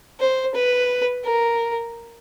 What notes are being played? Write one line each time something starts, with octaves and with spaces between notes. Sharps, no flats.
C5
B4
A#4